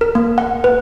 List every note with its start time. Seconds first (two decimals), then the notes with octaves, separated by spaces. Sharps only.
0.01 A#4
0.15 A#3
0.38 F#5
0.64 B4